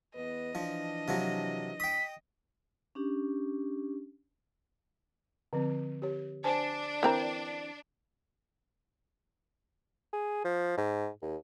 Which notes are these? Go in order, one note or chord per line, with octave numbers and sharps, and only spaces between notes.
E2 B3 B4 D#5
E3 F3 D4
C3 F3 F#3
G5 D#6 B6
C#4 D4 G4
D3 F3 C4
G4 C#5
D4 C5 G#5 A5
E3 C4 A#4
G#4
F3
G#2
D#2